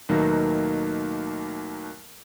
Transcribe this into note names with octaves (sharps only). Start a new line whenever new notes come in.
D#2 B2 D#3 F#3 A3 A#3